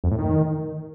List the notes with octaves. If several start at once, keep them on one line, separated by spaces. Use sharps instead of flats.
F2
A2
D#3